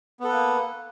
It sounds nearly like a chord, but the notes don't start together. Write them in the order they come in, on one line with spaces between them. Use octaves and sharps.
B3 A4 B4 A#3